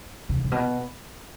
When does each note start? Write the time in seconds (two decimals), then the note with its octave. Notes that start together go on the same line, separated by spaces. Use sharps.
0.29 C3
0.44 A#2
0.52 B2